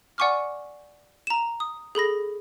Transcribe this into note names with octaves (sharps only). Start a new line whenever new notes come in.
D5 F#5 G#5 C#6 D6 F6
A#5 E7
D#6
G#4 A4 B5 A#6